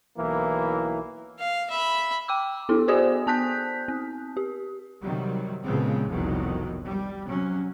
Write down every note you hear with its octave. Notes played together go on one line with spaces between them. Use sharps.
B1 E3 A#3 E4
F5
E5 B5
G5 D6 E6
B3 E4 A4
F#4 G#4 C5 D5 G#5 D#6
B3 A5 D#6 F#6 G6 B6
C4
G4
C3 D#3 F#3 G3
A#2 C#3 F3 G#3 B3 C4
F1 C2 F2 B2 D#3 F#3
G3
C3 F#3 C#4